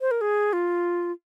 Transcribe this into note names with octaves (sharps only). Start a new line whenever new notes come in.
C5
A#4
G#4
F4